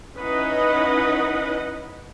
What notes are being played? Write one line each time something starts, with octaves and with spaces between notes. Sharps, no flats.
C#4 D#4 E4 B4 D#5 F#5